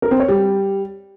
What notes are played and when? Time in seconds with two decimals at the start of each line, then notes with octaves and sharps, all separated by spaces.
0.02 A#4
0.11 C4
0.20 C#5
0.28 G3